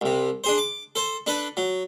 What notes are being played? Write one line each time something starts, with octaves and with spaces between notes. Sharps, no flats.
C2 C3
D4 G#4 C5
D6
A4 C5
D4 A4 B4
F#3